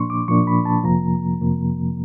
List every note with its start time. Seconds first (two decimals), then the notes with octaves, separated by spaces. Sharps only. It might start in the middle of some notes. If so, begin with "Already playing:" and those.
Already playing: A#2 F3 A#3 D4 C6 C#6
0.10 D6
0.28 A#2 F3 A#3 D4 C#6
0.47 B5
0.65 A5
0.84 F2 C3 F3 A#3 A#5
1.41 F2 C3 F3 A#3